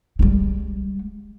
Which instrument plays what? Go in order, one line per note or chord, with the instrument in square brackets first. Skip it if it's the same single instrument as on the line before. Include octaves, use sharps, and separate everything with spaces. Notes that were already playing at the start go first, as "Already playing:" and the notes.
[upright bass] G3 G#3